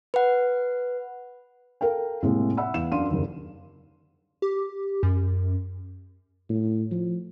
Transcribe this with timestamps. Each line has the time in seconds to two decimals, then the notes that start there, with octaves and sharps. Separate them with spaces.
0.14 B4 F#5
1.81 A4 A#4 F5 G5
2.22 A2 C3 G#3 A#3
2.57 E5 F#5 B5 E6
2.74 E2 F5 E7
2.92 F#2 D4 F5 C6 D#7
3.10 F#1 D#2
4.42 G4
5.03 F#2
6.49 A2
6.91 F3